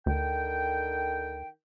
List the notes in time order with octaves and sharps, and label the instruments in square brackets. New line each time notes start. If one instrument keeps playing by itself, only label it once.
[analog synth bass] D2 [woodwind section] D3 D#3 G5